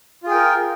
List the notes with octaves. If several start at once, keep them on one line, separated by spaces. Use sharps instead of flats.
F4 G#4 A#4 G5